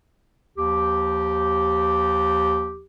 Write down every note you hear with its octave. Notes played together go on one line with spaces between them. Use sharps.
D#2 F3 G4